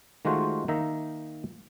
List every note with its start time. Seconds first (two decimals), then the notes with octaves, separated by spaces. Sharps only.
0.25 D#3 G#3 A3 F4 F#4 C5
0.68 D#3 A#3 D#4 E5 A#5